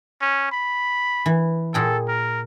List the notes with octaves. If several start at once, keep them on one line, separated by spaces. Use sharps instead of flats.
C#4
B5
E3
A#2 G#4 A4 G5
A#4